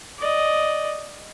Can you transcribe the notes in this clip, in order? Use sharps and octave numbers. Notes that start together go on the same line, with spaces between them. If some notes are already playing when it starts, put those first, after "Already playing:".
D5 D#5